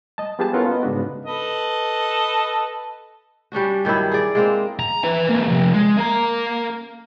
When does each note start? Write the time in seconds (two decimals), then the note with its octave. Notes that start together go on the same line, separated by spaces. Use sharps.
0.18 D#5 A5
0.39 B3 F4 G4 G#4 B4 A5
0.53 B3 C#4 E4 F4 A4 A#4
0.69 B3 D#5
0.83 G#2 C#3 B3 D4 F#4
1.26 A4 B4 D#5
3.52 G3 C#4 D4 F#4
3.85 G2 D#3 F#3 E4
4.12 G#4 D5
4.35 G#3 A#3 C4
4.80 A#5
5.04 B4 E5
5.30 G#3 A#3
5.48 C3 F3
5.73 G#3
5.97 A#3 A#5